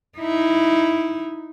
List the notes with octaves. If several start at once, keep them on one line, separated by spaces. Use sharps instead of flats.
D#4 E4